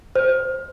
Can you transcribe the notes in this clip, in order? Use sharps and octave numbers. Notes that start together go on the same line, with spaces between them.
C5